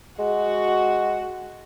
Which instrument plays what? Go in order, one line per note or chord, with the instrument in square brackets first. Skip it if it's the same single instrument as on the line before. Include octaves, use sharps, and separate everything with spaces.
[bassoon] G#3 [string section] F#4